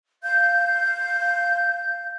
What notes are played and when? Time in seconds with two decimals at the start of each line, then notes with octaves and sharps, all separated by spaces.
0.23 F5 G6